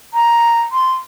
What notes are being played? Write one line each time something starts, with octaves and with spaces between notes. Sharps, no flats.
A#5
C6